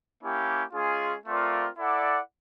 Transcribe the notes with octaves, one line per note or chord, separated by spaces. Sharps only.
A#3 C#4 E4 G4
G#3 C#4 F4 G#4
A3 C4 F4 A#4 D5
E4 A4 D5 F#5